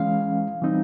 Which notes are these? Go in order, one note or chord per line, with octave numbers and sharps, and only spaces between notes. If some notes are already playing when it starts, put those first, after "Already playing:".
Already playing: E3 G#3 C#4 F5
E3 G3 C4 D#4